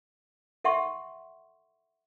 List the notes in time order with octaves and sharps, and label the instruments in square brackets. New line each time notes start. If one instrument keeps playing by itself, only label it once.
[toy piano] A4 E5 F#5 C6 C#6